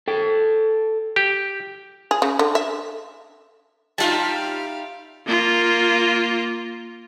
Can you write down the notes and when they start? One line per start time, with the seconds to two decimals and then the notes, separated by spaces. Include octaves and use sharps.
0.08 A4 G5
1.16 G4
2.11 G#4
2.22 C#3
2.39 D3
2.55 E5
3.98 G3 D#4 F4 G4 E5 F5 A5
5.26 A#3 F4